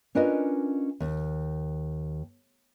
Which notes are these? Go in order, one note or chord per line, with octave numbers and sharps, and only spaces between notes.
C#4 D4 F4 A#4 B4 D#5
D#2